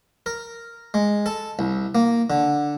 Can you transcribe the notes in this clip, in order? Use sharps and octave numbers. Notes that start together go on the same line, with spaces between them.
A#4
G#3
A4
C2
A#3
D3